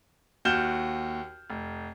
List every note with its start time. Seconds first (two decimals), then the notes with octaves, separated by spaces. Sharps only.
0.45 D#2 F#4 F6 G6 E7 G7
1.50 F1